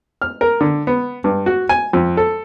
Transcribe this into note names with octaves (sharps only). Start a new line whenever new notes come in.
F6
A#4
D3
B3
G2
F#4
G#5
F2
A4